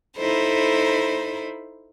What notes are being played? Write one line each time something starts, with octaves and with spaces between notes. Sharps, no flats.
D#4 E4 A4 C5 B5